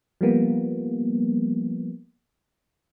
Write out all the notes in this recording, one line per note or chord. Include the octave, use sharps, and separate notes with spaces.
F3 G3 A#3 B3